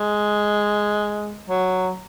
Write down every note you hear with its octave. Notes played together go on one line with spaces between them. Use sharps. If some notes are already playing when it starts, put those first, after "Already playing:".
Already playing: G#3
F#3